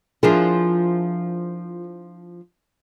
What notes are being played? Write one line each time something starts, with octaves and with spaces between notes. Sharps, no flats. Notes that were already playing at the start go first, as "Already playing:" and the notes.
F3 D4 E4 F4 G#4 A#4